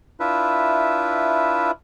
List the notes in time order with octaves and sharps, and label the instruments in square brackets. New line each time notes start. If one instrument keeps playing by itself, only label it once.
[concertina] D4 E4 F4 B4 E5